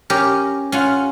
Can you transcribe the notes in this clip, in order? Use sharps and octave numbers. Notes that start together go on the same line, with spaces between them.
C#4 G4 A#4
C#4 F4 F#5